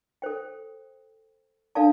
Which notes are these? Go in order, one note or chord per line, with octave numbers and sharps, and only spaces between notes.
A4 C5 G5
D4 A4 D5 F5 A5